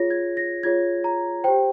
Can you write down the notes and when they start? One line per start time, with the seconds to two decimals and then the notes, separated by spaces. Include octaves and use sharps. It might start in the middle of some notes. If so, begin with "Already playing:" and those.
Already playing: F4 G#4 C#5 A#6
0.11 G#6
0.37 A#6
0.63 F4 G#4 C#5 G#6
1.04 A#5
1.44 G4 C5 G5